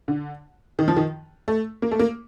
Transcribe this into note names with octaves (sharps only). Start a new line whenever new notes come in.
D3
D#3
F3
D#3
A3
A#3
A3
A#3